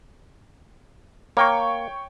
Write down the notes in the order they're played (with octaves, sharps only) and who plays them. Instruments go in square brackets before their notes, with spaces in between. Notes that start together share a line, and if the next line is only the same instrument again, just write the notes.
[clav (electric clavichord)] A#3 [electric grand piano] C#5 G5 C#6